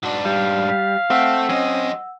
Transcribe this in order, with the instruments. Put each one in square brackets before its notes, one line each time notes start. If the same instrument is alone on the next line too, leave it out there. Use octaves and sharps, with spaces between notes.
[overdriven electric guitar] G#2 D4 [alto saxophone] F#4
[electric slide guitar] G3 [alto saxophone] F5
[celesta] B6
[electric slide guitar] C4 [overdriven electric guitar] A4 E5 [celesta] F#5 E6
[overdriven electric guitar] F#3 D#5 [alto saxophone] C#4